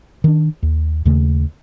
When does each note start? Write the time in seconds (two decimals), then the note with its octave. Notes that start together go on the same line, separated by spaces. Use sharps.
0.24 D#3 D4
0.63 D#2
1.05 D#2 C#3 A3